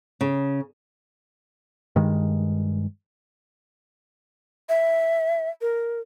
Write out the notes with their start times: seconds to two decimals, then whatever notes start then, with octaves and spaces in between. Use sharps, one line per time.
0.21 C#3
1.96 G2 D#3 G#3
4.69 E5
5.61 A#4